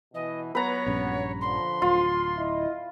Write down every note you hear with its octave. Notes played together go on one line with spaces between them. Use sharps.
B2 E3 D#5
F#3 B3 B4 C#5 A#5
A#1 G2 C#4
D3 F3 C6
D1 F4
E4 D#5